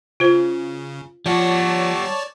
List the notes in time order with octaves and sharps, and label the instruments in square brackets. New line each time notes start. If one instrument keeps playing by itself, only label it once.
[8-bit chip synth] C#3 [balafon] F4 C5
[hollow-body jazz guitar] F3 [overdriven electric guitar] G3 F#5 [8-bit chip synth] C#5 D5 A5